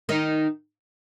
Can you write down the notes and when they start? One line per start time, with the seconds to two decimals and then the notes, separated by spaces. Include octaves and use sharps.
0.09 D#3 D#4